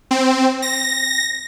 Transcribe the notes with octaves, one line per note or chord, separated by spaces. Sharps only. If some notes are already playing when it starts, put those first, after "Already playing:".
C4
A#6